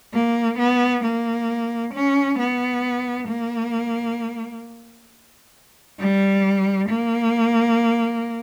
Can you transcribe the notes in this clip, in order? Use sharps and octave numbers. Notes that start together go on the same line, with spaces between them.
A#3
B3
A#3
C#4
B3
A#3
G3
A#3